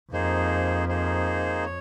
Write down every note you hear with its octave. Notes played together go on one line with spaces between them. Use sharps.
F2 A#3 D#4 G#4 C5
A#3 D#4 G#4 C5
C#5